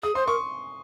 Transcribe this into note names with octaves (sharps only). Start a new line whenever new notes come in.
G#4 D#6
C5 C6
A#4 C#6